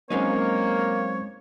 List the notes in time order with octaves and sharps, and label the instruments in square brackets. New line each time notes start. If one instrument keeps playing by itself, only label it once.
[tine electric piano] F#3 C4 C5 [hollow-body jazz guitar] G#3 C#4 D#4 [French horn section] A#3 [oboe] C#5